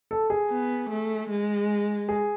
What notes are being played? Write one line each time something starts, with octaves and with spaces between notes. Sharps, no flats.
A4
G#4
B3
A3
G#3
G#4